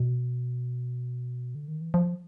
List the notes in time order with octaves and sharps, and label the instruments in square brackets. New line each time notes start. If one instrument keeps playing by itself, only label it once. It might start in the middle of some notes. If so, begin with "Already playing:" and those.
Already playing: [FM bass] B2
D3
D#3
E3
F3